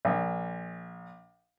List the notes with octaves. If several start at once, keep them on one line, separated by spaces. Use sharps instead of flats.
A#1